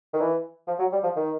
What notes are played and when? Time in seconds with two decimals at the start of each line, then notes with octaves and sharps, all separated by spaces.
0.14 D#3
0.20 E3
0.67 F3
0.79 F#3
0.92 G3
1.03 F3
1.16 D#3